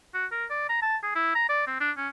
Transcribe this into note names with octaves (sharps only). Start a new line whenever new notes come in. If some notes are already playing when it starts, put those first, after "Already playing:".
F#4
A#4
D5
A#5
A5
G#4
E4
A#5
D5
C4
D4
C#4